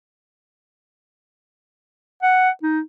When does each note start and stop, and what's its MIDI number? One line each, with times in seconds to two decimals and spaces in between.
2.23 2.49 78
2.63 2.80 63